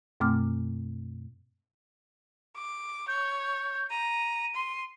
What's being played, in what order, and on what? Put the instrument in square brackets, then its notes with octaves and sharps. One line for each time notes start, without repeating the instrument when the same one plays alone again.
[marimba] F#2 B2 A3 C4 D6 F6
[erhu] D6
[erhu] C#5 [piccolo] G6
[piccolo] G6
[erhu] A#5 [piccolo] D#7
[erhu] C6